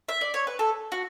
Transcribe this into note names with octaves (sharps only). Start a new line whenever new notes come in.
E5
D5
C#5
B4
A4
F#4